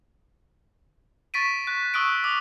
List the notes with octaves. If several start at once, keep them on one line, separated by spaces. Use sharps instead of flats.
C#6 A6 B6 D7 D#7
C#6 F#6
C#6 D#6 E6 F#6 D7
D6 D#6